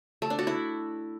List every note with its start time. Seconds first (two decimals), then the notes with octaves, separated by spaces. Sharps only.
0.22 A3
0.30 D4
0.39 F#4
0.47 E4